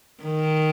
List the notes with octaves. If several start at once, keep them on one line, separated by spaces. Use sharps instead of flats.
D#3